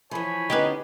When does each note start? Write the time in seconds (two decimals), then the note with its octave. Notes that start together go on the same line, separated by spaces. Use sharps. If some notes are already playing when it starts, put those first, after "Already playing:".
0.11 E3 F3 C#5 G#5 B5
0.50 D3 B3 C#4 D#4 G4 G#4 B4